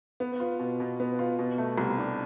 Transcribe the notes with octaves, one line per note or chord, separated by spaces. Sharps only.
B3
F4
B2
B2
B3
F4
B2
A3
C2
D4